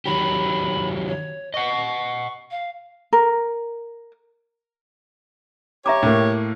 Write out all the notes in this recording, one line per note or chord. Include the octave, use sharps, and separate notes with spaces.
D#3 F#3 G4 B5
C#5
D#5 F#5 C#6
F5
A#4
G4 C#5 E5 A#5 D6
A2 A#3